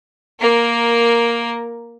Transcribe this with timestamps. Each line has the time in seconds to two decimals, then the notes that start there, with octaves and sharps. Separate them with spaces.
0.40 A#3 A#4